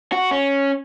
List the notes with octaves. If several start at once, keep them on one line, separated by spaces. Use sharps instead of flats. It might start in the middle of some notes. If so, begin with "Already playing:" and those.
F#4
C#4